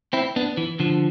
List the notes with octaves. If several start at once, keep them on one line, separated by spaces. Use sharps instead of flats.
C4 E4
B3 D4
E3
D3 F3